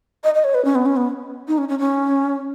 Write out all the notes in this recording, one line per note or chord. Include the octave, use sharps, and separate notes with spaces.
D#5
D#5
C#5
B4
C#4
B3
C#4
B3
D#4
C#4
C#4
C#4